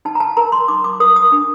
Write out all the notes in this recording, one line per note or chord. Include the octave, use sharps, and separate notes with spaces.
D#4 A5
A#5
A5
A#4 A#5
C6
D#4 D6
D6
A#4 D#6
D#6
D4